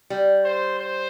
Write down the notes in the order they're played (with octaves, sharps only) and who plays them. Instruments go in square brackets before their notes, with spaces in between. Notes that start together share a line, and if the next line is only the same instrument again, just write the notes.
[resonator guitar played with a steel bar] G3
[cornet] C5
C5